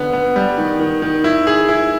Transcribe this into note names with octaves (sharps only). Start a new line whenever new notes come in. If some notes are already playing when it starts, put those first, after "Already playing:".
Already playing: D3 B3
B3
G3
D#3
D#3
D#3
E4
G#4
E4